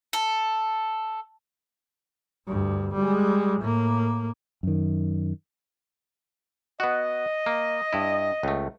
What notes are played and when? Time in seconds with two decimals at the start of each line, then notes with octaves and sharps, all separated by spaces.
0.13 A4
2.47 D2 G2
2.95 G3 G#3
3.60 A2 A#3
4.63 F#2 D#3
6.80 B3 F#4 D#5
7.46 A#3
7.93 G2 E4
8.43 C#2 A3